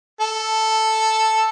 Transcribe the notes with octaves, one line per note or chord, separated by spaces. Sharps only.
A4